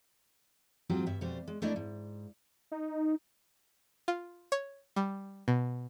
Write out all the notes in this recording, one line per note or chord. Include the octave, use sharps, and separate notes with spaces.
G#2 F#3 C4 F4 G4
G2 E5
F2 B2 G3 C5
G#3
A3 A#3 D4 E4 D5 D#5
G#2
D#4
F4
C#5
G3
B2